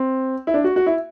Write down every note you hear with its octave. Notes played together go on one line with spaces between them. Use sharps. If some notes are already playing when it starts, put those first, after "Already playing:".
Already playing: C4
E4
D4
F#4
F#4
E4